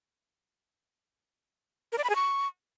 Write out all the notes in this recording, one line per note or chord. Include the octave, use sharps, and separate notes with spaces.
A#4
D5
B5
G#4
C#6